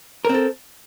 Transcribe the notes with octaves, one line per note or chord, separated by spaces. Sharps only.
C4 A4 A#4